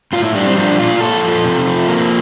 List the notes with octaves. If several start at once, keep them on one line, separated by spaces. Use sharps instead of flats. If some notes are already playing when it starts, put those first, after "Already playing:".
A2 F4
E4
G3 D4
C4
F3 D4
A#2 F4
A#2 A4
F3
C3
F3
A#3